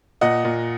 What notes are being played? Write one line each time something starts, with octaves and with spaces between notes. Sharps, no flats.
A#2 D#5 F#5
A#2